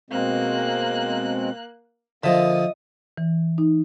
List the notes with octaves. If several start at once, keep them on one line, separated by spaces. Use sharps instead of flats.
B2 G#3 A#3 C4 F#6
D3 F3 A#3 D#5 E5 D#6
E3
D#4